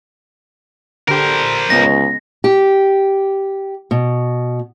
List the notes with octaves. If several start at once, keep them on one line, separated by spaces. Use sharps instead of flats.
D3 G4 A#4 C5
C#2 G#3 B3 C#4 A#6
G4
B2